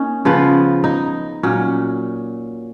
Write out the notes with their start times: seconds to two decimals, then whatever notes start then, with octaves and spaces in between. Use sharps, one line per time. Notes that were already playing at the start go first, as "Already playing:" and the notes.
Already playing: A#3 C#4 D#4
0.25 C#3 F3 B3
0.84 D#4
1.43 A#2 F#3 C#4